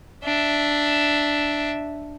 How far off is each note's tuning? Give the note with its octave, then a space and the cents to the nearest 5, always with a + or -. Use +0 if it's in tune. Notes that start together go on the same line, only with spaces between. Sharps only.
D4 +0 E5 +0